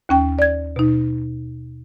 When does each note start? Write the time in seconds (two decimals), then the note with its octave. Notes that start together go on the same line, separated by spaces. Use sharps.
0.09 D#2 C#4 G5
0.39 D5 G#6
0.76 B2 D#4